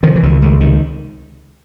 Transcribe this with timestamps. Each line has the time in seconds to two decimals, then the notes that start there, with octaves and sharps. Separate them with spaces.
0.03 C3 D#3 F3
0.16 E3
0.23 C#2 D#3
0.42 C#2 D#3
0.60 C3 D#3